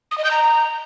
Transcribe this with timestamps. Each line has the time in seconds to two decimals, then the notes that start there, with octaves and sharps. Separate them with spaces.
0.11 D#6
0.18 D#5
0.24 G6
0.31 A#5